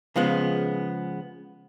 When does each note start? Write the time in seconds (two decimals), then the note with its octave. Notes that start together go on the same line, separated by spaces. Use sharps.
0.16 C#3 F3 G#3 B3